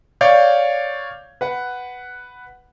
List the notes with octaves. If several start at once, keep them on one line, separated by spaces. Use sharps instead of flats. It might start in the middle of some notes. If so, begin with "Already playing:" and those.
C#5 D5 F5 G6 G#6
B4 F#5